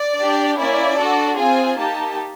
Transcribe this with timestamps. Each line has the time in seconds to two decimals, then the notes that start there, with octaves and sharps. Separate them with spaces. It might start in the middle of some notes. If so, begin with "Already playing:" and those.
Already playing: D5
0.17 D4 G4
0.58 A#3 C#4 E4 D5
0.98 D4 F#4 A4
1.37 C4 F4 G#4 G#5
1.77 A#3 D#4 G4 A5